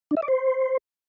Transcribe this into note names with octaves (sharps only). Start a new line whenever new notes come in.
D4
E5
D5
C5